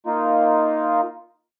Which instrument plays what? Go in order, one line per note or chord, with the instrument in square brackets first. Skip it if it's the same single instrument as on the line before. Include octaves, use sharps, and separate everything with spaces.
[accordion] A#3 D#4 F4